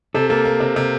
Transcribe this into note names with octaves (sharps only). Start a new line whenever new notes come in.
C3 A4
A#3 A4
A#3
C3
C3